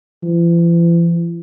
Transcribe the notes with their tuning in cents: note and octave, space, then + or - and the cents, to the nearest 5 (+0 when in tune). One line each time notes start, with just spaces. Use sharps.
E3 +45